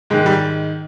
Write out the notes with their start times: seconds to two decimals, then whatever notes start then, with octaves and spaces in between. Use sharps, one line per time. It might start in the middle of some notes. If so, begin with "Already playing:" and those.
0.10 G#2 D#3 G#3
0.26 G3